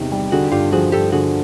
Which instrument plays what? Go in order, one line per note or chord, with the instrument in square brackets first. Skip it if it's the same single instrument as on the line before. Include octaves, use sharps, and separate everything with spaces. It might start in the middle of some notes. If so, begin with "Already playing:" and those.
Already playing: [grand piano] E2 C3 D#3 G3
G3
[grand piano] D3 [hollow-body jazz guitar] F#4 G#4
[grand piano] G2 [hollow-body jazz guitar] F4 G4
[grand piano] F3 [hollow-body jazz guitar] F#4 G#4
[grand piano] G2 [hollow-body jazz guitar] G4 A4
[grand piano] D3 [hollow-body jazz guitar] F#4 G#4